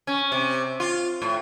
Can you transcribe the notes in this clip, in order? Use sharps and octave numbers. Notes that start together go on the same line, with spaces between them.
C#4
C3
F4
A2